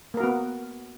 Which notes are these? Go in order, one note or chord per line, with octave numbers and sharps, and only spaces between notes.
A#3 B3 F#4 A#4